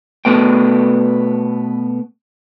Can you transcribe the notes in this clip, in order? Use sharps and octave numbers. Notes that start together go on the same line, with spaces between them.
B2 A3 B3 G5